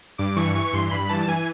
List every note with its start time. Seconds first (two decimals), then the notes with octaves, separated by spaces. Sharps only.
0.18 G2 D6
0.36 E3 C#6
0.55 E3 C#6
0.73 G2 C6
0.91 G2 B5
1.09 E3 A5
1.28 E3 G#5